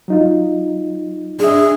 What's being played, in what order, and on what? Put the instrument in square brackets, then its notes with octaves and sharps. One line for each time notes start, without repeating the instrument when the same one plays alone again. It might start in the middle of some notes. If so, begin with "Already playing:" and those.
[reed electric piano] F#3 D#4 F4
[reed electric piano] D4 E5 [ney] G#4